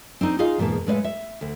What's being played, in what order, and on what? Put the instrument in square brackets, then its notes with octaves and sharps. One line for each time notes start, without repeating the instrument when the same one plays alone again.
[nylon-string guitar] C4 D4 D#4
D#4 F4 G#4 D#5 F5
E2 G#2 B2 A#3 A5
A2 G#3 B4 C#5 E5 F5
E5
D2